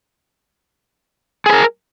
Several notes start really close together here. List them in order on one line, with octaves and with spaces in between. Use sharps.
G#4 B4 A#4